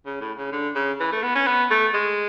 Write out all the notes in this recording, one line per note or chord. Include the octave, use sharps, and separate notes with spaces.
C#3
A2
C#3
D3
C#3
E3
A3
B3
C#4
B3
A3
G#3